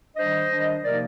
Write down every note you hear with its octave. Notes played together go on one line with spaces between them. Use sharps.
D#3 G3 D4 C5 D#5
D#3 G3 D4
C3 F3 A#3 D#4 A#4 D5